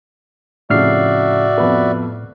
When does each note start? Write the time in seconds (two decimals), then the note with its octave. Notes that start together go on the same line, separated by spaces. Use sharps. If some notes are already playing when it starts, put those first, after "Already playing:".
0.70 F2 A2 C#3 F#4 D5 E5 F6 C7
1.58 F2 B3 B4